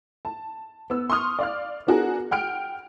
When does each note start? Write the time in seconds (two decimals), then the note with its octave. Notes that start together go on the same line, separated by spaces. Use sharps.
0.25 A5
0.90 B3 E6
1.10 C6 C#6 D#6 F6
1.39 D5 F5 F6
1.87 B3 D4 F#4 G#4 A#4
2.31 F#5 G5 F6 D7